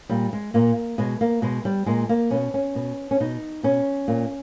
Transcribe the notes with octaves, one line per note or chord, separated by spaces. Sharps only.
A#2 G3
G#3
A#2 A#3
B2 G#3
A#3
B2 G#3
G3
A#2 G#3
A#3
B2 C#4
C#4
B2
C#4
B2 D#4
B2 C#4
A#2